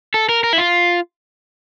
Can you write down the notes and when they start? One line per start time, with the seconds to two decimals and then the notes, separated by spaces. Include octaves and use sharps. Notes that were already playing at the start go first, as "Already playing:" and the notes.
0.14 A4
0.29 A#4
0.44 A#4
0.53 E4
0.58 F4